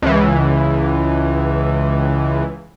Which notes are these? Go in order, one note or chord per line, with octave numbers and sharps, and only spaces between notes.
C#2 E3